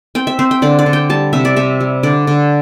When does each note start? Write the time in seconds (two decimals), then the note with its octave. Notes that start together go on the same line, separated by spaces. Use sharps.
0.15 C4 G5
0.27 E5
0.39 C4 C5
0.51 G5
0.62 D3 D5
0.79 D5
0.86 D3
0.93 G5
1.10 G3 A5
1.33 C3 E5
1.45 D5
1.56 C3 E5
1.81 G3
2.03 D3 D5
2.27 D3